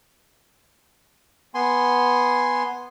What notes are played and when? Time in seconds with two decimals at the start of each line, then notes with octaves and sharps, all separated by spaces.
1.55 B3 G#5 C6